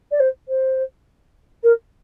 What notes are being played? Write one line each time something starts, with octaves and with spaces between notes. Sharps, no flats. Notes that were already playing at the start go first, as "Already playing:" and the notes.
D5
C5
C5
A#4